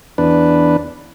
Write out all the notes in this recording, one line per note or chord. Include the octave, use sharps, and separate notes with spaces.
E2 D4 B4